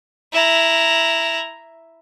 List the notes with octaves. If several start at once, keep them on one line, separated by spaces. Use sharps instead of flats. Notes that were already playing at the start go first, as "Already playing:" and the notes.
E4 A#5